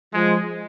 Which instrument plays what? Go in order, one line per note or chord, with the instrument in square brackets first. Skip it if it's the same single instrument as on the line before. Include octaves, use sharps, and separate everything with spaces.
[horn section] F3 G#3